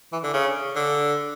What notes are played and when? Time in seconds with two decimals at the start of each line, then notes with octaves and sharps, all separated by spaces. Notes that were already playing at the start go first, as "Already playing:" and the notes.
0.12 E3
0.23 D3
0.34 C#3
0.75 D3